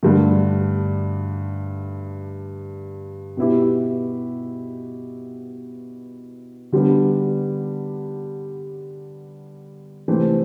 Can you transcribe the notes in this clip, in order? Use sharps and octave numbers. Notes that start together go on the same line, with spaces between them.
G2 D3 A3
B2 B3 E4 G4
D3 G3 B3 D4
C3 E3 A3 C4